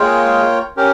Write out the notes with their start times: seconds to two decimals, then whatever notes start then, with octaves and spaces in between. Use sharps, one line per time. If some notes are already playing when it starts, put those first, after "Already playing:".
Already playing: G#3 A#3 F4 A#4 C#5 G5
0.77 C#4 G4 A#4